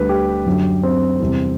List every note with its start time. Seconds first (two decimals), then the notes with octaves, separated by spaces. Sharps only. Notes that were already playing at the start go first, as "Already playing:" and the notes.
Already playing: D2 D3 G3 B4
0.09 G4
0.46 F#2 D3 F#3
0.83 C4
1.20 E2 C3 G3